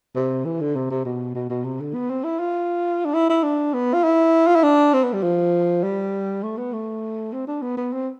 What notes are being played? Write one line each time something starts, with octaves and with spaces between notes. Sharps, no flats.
C3
E3
D3
C3
C3
B2
B2
B2
C3
D3
B3
C4
E4
F4
D4
E4
E4
D4
B3
F4
E4
F4
E4
D4
C4
B3
G3
F3
G3
A3
B3
A3
C4
D4
B3
B3
C4